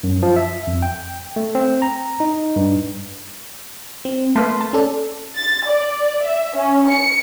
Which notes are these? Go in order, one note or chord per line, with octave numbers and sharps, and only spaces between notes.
F#2
F3
E5
F2
G5
A3
C4
A#5
D#4
G2
C4
A3 A#3 B4 C6
A5
C#4 A4 D5
A6
D5
E5
C#4
C#7